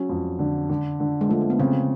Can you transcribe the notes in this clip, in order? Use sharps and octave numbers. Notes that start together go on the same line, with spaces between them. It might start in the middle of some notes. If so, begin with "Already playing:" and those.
Already playing: F#3 C#4
F2
D3
D3
D3
G#3
F3 A3
A#3
B3
C#3 C4